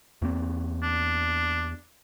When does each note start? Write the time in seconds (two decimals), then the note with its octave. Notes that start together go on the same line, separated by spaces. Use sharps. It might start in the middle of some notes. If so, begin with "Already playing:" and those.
0.22 E2 A#3 C4
0.83 D4